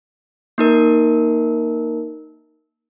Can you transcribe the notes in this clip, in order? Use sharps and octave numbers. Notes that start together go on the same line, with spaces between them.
A#3 D#4 A#4